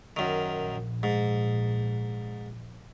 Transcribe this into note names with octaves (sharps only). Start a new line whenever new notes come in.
F#2 D#3
A#1
G#2